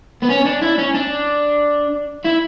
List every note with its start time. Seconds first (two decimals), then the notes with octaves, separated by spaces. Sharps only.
0.23 B3
0.30 C#4
0.46 D4
0.62 E4
0.78 C#4
0.94 D4
2.24 E4